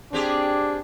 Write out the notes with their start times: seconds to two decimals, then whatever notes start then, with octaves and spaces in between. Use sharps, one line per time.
0.13 C4 D4 G4 G#4